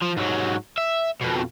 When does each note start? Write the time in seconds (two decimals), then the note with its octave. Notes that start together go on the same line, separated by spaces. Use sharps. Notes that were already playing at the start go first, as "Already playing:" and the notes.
0.02 F3
0.17 G#2 F#3
0.78 E5
1.21 F2 B2